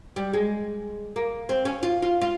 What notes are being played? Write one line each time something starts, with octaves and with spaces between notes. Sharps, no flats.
G3
G#3
A#3
C4
C#4
F4
F4
F4